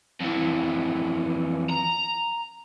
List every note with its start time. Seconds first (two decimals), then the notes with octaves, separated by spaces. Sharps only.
0.21 F2 E3
1.70 A#5